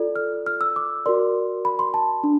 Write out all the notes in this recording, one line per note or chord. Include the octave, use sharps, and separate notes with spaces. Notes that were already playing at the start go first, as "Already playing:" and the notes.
Already playing: F4 A4 D5
F6
F6
E6
D6
F#4 A#4 D5 C6
B5
C6
A5
D4